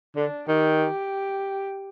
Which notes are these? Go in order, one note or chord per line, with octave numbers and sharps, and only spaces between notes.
D3 D4
D#3 G4